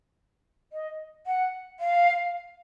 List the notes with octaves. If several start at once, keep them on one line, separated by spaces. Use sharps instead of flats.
D#5
F#5
F5